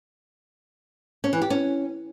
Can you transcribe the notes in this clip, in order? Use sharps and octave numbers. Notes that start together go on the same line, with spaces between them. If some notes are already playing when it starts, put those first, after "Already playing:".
C#4
E3
G4
C#4